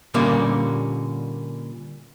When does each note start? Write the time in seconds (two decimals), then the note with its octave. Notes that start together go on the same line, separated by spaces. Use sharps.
0.14 A#2 D3 G3 A#3 C#4